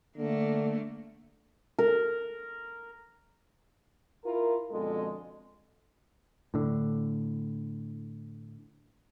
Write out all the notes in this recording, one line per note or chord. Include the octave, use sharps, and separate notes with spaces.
D3 A3 A#3
A#4
E4 F4 A#4
F2 B2 D3 G#3 A4
A2 D3